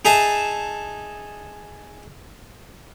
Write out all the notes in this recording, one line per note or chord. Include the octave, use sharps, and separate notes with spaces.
D#4 G#4 E5 G#5 A5